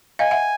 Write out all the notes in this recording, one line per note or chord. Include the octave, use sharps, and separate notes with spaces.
D#5 F5 G#5
E5 F#5